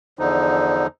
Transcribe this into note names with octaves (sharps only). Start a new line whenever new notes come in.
E2 D3 F3 D#4